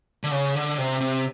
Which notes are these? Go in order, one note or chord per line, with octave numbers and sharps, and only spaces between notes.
D3
C#3
D3
C3
C3